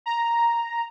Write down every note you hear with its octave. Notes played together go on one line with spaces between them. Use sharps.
A#5